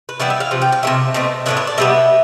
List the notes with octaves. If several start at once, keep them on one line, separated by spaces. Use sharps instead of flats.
B4
E3 G3 B3 E4 D5
E5
F5
C3 F3
G5
F5
C3 E3 A3 E5
B2 A3 C4
A2 E3 B3 D4 E5
E5
D5
B2 G3 B3 E5